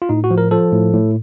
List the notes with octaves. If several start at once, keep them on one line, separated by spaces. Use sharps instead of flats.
F4
A2 D#4
F#4
F3
A#4
F3 A4
A2
A2